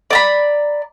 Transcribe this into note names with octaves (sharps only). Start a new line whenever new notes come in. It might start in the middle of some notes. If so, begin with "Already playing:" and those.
D5 A#5 B5